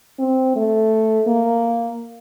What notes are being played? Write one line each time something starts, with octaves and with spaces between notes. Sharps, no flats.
C4
A3
A#3